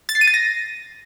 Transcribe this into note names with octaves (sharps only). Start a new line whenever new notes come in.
A6
C7
D#7
A6
A#6